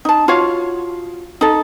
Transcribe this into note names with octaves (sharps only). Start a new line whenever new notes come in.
D#4 A5
F4 F#4 C#5 F5
D#4 A4